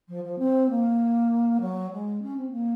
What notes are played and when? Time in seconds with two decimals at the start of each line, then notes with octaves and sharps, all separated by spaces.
0.08 F3
0.24 F3
0.38 C4
0.69 A#3
1.61 F#3
1.91 G#3
2.22 C#4
2.37 C4
2.51 A#3